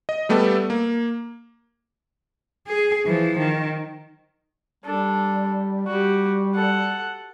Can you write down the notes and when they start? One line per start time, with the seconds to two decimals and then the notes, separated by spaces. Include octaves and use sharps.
0.09 D#5
0.29 G3 A3 B3 G4 A4
0.70 A#3
2.67 G#4
3.06 E3 F3
3.38 D#3
4.85 G3 D4 A4
5.87 G3 F#4 G4
6.55 A4 F#5